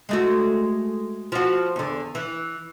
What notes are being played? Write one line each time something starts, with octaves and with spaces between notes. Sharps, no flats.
G#3 A3 F#4
F3 F#4
E2 D3
E3